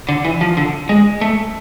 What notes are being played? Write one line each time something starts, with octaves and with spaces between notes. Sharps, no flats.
D3
E3
F3
D3
G#3
A3